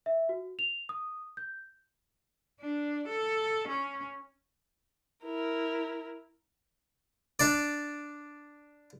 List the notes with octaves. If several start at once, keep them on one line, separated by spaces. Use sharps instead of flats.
E5
F#4
F7
D#6
G6
D4
A4
C#4
E4 A#4
D4 D5